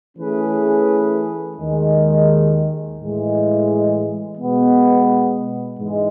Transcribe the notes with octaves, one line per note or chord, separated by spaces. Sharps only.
E3 A3 C#4 G#4 B4
D#2 D#3 G#3
A2 E3 G#3
B2 G#3 B3
G#2 E3 G#3